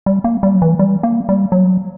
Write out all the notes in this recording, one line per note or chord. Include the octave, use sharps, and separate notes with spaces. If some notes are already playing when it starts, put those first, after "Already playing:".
G3
A#3
G3
F#3
E3
G3
A#3
G3
F#3